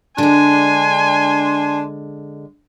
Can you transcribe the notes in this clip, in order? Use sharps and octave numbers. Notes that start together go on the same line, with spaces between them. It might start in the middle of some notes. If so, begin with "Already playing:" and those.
D3 G#3 D4 G#5 C6